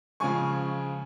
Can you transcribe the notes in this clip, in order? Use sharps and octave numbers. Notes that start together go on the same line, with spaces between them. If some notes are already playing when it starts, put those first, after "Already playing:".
C#3 F3 G#3 G#5 C#6